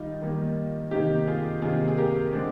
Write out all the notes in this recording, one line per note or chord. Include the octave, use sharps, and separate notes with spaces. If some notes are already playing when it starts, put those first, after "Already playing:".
Already playing: D#3 G3 D#4 F4
D#3 G3 A#3
C3 D#3 A#3 D#4 G4
F4 G#4
C3 D#3 A#3 F4 G#4
G#4
G4 A#4
D3 G#3 C4 D4